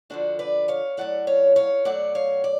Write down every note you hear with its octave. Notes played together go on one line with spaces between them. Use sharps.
D2 D3 F3 D4 F#4
B4 D5
C#5 F5
A2 F#3 A3 D5 F#5
C#5 F5
C#5 F5
B2 F#3 A3 D5 F#5
C#5 F5
D5